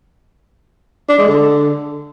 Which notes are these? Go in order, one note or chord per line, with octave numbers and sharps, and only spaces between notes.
D4
G#3
D3